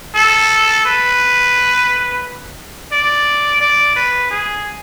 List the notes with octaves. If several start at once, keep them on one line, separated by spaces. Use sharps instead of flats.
A4
B4
D5
D5
B4
G#4